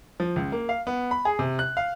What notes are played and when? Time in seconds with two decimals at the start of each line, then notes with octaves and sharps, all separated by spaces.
0.20 F3
0.36 C#2
0.52 A#3
0.69 F5
0.87 B3
1.11 B5
1.25 G#4
1.39 C3
1.59 F#6
1.77 F5